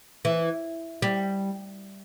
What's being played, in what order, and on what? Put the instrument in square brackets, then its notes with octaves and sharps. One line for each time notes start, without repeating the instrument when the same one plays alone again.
[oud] E3
G3